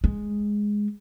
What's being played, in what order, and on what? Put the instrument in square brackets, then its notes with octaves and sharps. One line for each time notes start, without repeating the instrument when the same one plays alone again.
[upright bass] G#3